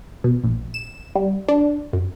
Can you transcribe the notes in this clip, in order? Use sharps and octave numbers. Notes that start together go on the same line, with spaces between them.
B2
A#1
E7
G3
D4
F#2